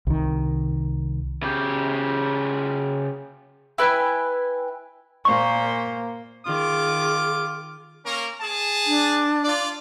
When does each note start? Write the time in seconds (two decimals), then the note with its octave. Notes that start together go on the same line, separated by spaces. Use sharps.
0.07 C2 D#3
1.42 C#3 G4
3.78 E4 B4 G5 G#5
5.25 A#2 A#3 C5 C#6
6.47 D#3 F4 G#4 D6
8.05 A#3 C#4 A#4
8.40 G#4 A5
8.87 D4
9.44 F4 D5